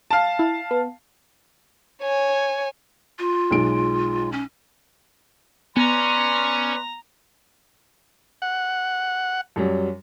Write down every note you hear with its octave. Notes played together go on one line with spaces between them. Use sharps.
F5 A5
E4
B3
C#5 G#5
F4
B1 G#3 D7
C#4
B3 C#4 B4 D5 A#5 C6
F#5
F#2 F#3 G3